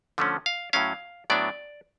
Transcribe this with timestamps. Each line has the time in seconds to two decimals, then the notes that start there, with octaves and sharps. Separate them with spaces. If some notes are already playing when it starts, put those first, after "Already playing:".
0.18 D3 F3 A3 C#4
0.46 F5
0.73 A2 F#3 C#4 F5
1.30 A2 F#3 B3 D4 D5